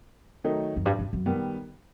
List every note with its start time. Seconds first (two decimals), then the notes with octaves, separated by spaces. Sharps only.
0.44 D#3 F#3 A3 D#4
0.76 F#2
0.86 G2
0.99 G2
1.13 F#2
1.26 D#3 G3 B3